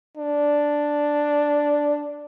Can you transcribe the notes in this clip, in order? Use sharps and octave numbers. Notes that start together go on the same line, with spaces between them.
D4